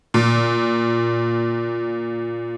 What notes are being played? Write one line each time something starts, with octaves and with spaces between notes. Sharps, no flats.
A#2